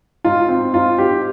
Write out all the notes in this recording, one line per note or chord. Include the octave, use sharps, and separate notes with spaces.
G#2 F4
C4
G#2 F4
G#2 G4